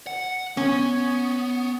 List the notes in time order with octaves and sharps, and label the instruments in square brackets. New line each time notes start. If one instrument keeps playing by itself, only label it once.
[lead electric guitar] F#5
[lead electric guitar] B3 [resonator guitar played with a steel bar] C#4